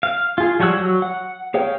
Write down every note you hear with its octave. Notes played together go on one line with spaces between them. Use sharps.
F5
F4 G#4
F3 G3 C#5 F#5 E6
F#3
F#5
G#4 C#5 F5 G5